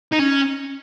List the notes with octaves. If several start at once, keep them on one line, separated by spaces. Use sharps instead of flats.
D#4
C#4